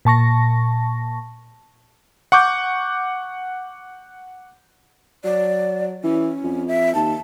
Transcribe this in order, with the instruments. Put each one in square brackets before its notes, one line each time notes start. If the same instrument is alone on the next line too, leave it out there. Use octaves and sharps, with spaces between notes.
[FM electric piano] A#2 A5 C#6 A#6
[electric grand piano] F#5 C#6 D6 G6
[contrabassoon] F#3 [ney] D5
[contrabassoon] E3 [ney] C#4
[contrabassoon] F2
[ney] E5
[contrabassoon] D#2 [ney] A5